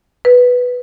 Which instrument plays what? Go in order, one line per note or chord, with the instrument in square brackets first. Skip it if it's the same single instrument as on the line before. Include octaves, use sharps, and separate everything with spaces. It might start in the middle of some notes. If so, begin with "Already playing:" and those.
[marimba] B4